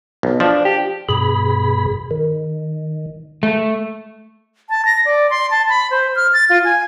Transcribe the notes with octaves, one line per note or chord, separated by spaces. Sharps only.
B1
F3 D4
G4
G2 B2 G#4 B5
D#3
A3
A5
A#6
D5
C6
A5
B5
C5
F6
A6
F4
G#5